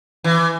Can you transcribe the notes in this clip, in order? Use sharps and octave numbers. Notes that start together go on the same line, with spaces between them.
E3